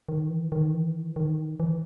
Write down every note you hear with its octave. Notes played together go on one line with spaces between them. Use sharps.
D#3
E3
D#3
E3
D#3
E3